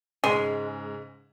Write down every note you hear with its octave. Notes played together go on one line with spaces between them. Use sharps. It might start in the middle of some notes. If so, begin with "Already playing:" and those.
G#2 C#3 G#3